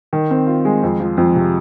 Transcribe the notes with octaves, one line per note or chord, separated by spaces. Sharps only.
D#3
C4
F4
G#3
F2
F3
F2
C3